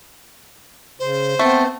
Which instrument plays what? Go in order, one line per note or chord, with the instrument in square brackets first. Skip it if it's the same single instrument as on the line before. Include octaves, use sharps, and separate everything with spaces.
[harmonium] C#3 [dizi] C5
[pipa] A3 [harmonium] B3 C4